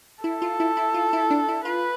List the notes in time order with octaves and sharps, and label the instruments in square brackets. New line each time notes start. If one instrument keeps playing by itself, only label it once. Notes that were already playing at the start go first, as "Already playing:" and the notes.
[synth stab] E4 [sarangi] A4
[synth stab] F4
E4
E4
F4
E4
D4
E4
[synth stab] F4 [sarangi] B4